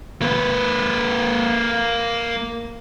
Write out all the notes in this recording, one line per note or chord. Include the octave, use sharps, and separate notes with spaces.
A#3 B4